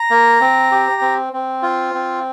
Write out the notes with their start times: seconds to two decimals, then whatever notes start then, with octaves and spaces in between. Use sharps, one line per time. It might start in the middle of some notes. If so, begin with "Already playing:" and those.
Already playing: A#5
0.10 A#3
0.41 C4
0.71 G4
1.01 C4
1.33 C4
1.62 F4
1.94 C4